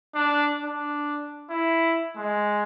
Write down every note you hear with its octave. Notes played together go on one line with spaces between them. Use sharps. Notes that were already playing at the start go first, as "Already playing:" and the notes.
D4
D4
E4
G#3